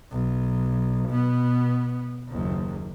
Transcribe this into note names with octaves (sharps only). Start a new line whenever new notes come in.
B1
B2 B3
F#1 D#2